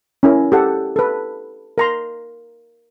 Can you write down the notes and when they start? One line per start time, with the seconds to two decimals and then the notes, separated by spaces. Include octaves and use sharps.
0.23 C#4 E4 A#4
0.52 G4 A4 F#5
0.96 A4 B4
1.78 A#4 A#5 C6